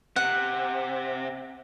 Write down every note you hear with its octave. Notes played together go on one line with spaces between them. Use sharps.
C3 F#5